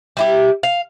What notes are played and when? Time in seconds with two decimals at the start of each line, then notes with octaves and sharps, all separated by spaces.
0.17 G3 E4 G4
0.63 F5